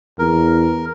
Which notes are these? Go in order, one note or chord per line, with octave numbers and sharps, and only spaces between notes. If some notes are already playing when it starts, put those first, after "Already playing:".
E2 A#4